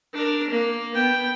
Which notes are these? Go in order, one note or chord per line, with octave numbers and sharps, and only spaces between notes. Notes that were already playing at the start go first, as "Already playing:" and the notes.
D4 A#4
A#3
B3 G5